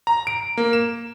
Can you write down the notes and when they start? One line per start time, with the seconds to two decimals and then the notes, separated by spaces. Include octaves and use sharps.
0.07 A#5
0.27 D7
0.57 A#3
0.73 E7